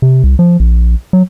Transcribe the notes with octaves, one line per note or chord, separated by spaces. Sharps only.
C3
C2
F3
A#1
F#3